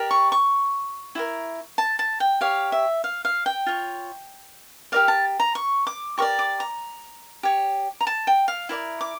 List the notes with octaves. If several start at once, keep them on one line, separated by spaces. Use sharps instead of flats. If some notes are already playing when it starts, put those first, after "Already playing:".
Already playing: G4 A#4 D5
C#6
C#6
E4 G4 A#4
A5
A5
G5
G4 C#5 F5
E5
F5
F5
G5
F4 C#5
G4 A#4 D5 F5
A5
A#5
C#6
D6
G4 A#4 D5 C#6
D6
A#5
G4 C#5
A#5
A5
G5
F5
E4 A#4 D5
D6